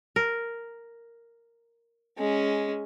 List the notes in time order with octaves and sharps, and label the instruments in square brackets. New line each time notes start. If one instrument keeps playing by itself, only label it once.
[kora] A#4
[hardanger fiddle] G#3 C#4